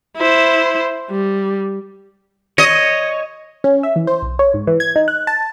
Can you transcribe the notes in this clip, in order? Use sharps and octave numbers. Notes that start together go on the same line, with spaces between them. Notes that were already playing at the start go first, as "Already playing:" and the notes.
E4 C5
G3
C#5 D#5
C#4
E5
E3
C5
B1
C#5
G#2
E3
G#6
D#4
F#6
A5